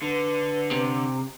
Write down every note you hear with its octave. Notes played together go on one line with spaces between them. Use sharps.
D3 B4
C3